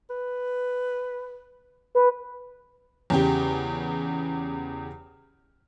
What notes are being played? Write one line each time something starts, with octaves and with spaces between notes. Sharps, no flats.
B4
B4
E2 C#3 G4